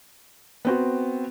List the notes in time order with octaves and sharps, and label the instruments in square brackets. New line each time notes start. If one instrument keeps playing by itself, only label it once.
[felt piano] B3 C4 F#4